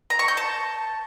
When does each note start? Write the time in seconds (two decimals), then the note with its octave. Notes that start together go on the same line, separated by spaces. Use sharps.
0.10 A#5
0.19 C#6
0.28 G6
0.37 A5